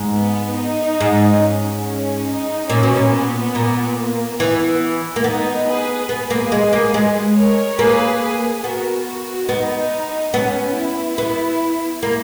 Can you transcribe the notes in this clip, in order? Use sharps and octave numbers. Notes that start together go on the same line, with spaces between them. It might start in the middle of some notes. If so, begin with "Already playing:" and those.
Already playing: G#2
B3
D#4
G#2
C#4
C#4
D#4
A#2 C#4
B2
A#2
B3
A#2
A#3
E3 B3
A#3
B3 D#4
G#4 B4
B3 G#4 B4
A#3
G#3
A#3
G#3
A#4 C#5
A#3 G#4 B4
G#4
B3 F#4 A#4
F#4
B3 D#4
B3 C#4
E4
B3
A#3